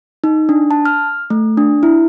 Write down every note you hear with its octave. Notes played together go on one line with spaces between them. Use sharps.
D#4
D4
A5
F6
A3
D4
E4